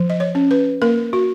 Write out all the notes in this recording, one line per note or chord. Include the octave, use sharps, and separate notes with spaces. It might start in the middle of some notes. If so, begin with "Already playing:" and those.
Already playing: F3
D#5
C#5
C#4
B4
A#3 A#4
F#4